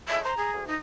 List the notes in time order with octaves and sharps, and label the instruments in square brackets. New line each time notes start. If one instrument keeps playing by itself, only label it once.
[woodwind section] C#3 G#3 A3 [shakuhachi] E5
[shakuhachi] C5 [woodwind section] A#5
[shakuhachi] G#4
[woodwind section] D2
[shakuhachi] D#4